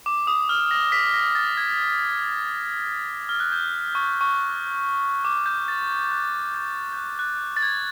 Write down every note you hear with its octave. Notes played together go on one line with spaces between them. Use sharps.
D6
D#6
F6
A#6
B6
A#6
A6
G#6
F6
F#6
G6
C#6
C#6
D6
G6
A6
G#6
F#6
G6
G6
F#6
F#6
A6
G#6